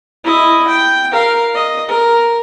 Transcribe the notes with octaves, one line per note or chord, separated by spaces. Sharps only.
E4 D#5
G5
A#4 F5
D#5
A#4